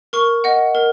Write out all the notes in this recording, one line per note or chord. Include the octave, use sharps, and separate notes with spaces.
A#4 C#6
D#5 F#5
A#4